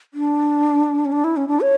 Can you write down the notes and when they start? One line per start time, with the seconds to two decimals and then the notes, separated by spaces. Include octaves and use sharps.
0.14 D4
1.05 C#4
1.12 D4
1.24 E4
1.37 C#4
1.48 D4
1.61 C#5